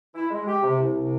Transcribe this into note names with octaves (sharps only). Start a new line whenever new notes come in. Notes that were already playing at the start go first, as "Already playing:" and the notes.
E4
G#3
G4
C3
C2
C3